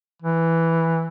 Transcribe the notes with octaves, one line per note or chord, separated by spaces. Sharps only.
E3